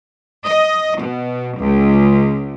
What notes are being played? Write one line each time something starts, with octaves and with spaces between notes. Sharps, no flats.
D#5
B2
C#2